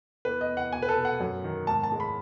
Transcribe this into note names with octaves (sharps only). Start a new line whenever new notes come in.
E2 B4
D#5
E2
F#5
B2 G#5
B4
A4
B2
F#5
F#2
D#3
G#2 A5
A5
G#3
B5